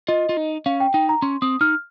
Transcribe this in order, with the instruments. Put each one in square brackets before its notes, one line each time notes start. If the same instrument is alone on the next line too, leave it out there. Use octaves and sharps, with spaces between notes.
[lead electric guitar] F4 [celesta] D#5
[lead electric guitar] F4
D#4
[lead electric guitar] C#4 [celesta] F5
[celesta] G5
[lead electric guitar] D#4 [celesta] G5
[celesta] A#5
[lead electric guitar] C#4 [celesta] C6
[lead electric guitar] C4 [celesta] D#6
[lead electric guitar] D#4 [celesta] F6